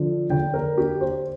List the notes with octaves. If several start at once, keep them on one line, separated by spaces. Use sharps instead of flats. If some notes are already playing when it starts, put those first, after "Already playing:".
Already playing: D3 F3
D3 G5
A#4
D4 G4
C5